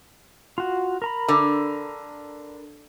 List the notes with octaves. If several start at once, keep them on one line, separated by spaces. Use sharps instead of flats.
F4 F#4
A#4 A#5 B5
D3